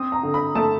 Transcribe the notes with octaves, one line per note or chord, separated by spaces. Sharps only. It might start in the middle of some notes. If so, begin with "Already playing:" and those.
Already playing: C4 D#6
A#5
D3
B5
A3 A5